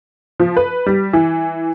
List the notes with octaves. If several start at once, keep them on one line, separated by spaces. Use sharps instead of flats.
F3
B4
G3
E3